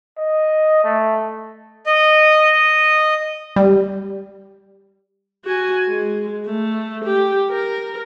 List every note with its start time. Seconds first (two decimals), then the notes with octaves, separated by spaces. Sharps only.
0.17 D#5
0.84 A3
1.87 D#5
3.56 G3
5.45 F#4 G#5
5.87 G#3
6.46 A3
7.05 G4
7.50 A#4